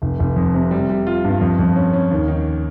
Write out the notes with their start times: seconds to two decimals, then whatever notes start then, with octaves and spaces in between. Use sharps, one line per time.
0.02 F1
0.20 F1
0.36 F2
0.54 C3
0.71 G3
0.89 G3
1.07 F4
1.24 G2
1.41 F2
1.59 F2
1.76 C#4
1.93 C#4
2.11 D#2
2.28 D#3